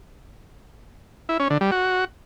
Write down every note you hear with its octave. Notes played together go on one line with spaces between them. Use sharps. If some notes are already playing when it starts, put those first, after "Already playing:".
E4
C#4
D3
G3
F#4